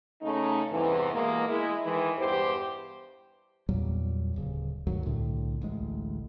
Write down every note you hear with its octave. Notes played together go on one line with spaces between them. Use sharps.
C#3 A3 C#4 D#4
E2 G2 C3 E3
B2 E3 G#3 A#3
G#3 E4
D#3 E3 G#3 E4
E2 G2 G4 C5
E2 A#2 F#3 G3
D1 C#3
D2 G2 D#3 F#3
C2 A2 D3
A1 D2 G#3